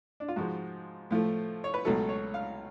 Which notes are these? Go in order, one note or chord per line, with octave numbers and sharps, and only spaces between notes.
D4
F4
G#2 F3 G#3 F#4
A2 F3 A3
C#5
B4
C#2 B2 F#3 A3 A4
C#5
F5